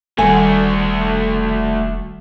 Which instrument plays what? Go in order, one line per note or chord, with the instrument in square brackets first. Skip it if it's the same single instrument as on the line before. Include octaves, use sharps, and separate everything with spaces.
[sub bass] E1 [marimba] D#3 G3 [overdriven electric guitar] A3 F#4 [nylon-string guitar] G#5